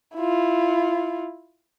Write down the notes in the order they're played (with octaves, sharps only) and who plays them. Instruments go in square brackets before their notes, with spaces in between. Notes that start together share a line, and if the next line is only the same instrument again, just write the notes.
[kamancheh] E4 F4